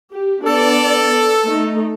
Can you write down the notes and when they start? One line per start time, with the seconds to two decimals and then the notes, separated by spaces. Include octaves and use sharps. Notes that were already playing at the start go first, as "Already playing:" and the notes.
0.12 G4
0.43 B3 D4 A4 D5
1.45 A3 D#4